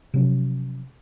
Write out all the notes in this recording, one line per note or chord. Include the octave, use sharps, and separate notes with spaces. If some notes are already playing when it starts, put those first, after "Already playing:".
C3 F3 F#3 C#4